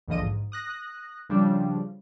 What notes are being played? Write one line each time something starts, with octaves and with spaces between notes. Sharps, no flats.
A#1 E2 D3 F3 D#5 D#7
G#2
D#6 F#6 A#6
C#3 F3 G3 D4